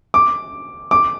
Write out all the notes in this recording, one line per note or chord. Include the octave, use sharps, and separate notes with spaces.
D6
D6